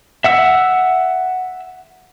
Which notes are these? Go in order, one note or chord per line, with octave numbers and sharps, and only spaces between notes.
E5 F#5 E6